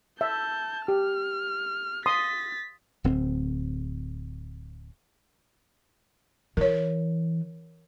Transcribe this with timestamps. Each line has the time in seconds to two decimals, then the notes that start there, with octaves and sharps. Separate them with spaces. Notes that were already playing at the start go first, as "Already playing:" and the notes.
0.21 E5 A5 G6
0.88 G4 F6
2.06 C6 D#6 A6 B6
3.04 D1 D2 C4
6.57 E3 A#4 C#5